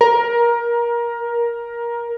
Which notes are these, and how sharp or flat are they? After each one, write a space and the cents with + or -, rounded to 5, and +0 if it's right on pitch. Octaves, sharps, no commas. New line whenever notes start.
A#4 +20